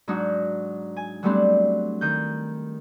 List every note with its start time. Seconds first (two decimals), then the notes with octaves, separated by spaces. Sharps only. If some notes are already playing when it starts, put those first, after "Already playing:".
0.08 G#2 F#3 D4 D#4 F#4
0.96 G#5
1.23 F#3 G3 A3 B3 C4 D4
2.01 D#3 G6